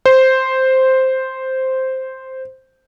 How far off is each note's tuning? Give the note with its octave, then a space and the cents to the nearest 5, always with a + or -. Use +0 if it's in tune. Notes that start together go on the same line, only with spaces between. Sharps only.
C5 +0